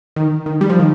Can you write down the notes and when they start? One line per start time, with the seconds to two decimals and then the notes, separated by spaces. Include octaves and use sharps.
0.16 D#3
0.46 D#3
0.61 G3
0.70 F3
0.80 D#3